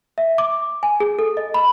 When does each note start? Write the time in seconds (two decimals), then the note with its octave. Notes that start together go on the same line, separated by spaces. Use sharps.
0.18 E5
0.38 D6
0.83 G#5
1.00 G#4
1.19 A4
1.37 D#5
1.54 B5